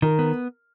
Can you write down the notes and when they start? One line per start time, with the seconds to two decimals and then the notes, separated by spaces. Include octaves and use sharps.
0.02 D#3 A#4
0.19 B3